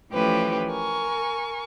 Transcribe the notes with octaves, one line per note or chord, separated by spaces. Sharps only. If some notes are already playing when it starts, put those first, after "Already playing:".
E3 F3 A3 C#4 G4 B4
A#4 G#5 C#6